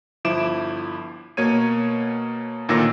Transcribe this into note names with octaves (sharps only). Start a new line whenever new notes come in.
G1 F3 E4 D6 D7 E7
B2 A#3 C#5 G#6 D#7
D2 A#2 D#3 C#5 E6 A#6